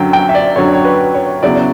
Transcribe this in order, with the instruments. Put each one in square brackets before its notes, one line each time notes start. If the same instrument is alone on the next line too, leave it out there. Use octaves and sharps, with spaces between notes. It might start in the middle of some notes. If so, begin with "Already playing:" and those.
Already playing: [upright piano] F#2 D3 F#3 G5
G5
E5
D5
F#2 D3 F#3 C#5
C#5
B4
C#5
E2 C#3 F#3 C#4 E4 D5